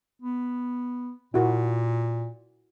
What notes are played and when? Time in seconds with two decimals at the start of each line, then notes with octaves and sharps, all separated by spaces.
0.22 B3
1.34 A#2 E4 F#4 A#4